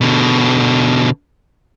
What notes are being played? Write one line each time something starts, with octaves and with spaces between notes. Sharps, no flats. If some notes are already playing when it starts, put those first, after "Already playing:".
B2 D3